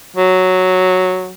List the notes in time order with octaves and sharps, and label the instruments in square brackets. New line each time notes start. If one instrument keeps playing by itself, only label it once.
[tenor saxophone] F#3